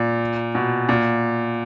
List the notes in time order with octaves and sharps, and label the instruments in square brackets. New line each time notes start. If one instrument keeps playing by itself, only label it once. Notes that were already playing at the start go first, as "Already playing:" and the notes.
Already playing: [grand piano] A#2
B2
A#2